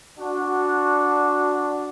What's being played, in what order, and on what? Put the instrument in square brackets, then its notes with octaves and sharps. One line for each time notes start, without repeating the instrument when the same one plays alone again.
[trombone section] D4 F#4